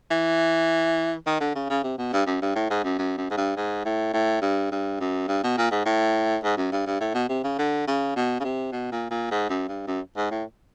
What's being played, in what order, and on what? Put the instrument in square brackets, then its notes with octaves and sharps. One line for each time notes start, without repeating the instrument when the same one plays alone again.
[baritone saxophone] E3
D#3
D3
C#3
C#3
C3
B2
G2
F#2
G2
A2
G#2
F#2
F#2
F#2
G#2
G2
G#2
A2
A2
G2
G2
F#2
G2
B2
A#2
G#2
A2
G#2
F#2
G2
G2
A2
B2
C3
C#3
D3
C#3
B2
C#3
C3
B2
A#2
A#2
G#2
F#2
G2
F#2
G#2
A2